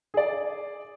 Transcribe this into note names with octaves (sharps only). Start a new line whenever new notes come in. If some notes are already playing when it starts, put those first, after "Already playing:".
G#4 D5